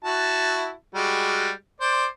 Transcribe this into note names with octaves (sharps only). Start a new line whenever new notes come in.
E4 F#4 A5
G3 G#3 F#4
C5 D5